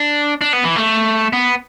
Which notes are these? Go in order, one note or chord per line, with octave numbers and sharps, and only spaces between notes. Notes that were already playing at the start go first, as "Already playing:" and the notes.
Already playing: D4
D4
B3
E3
A3
B3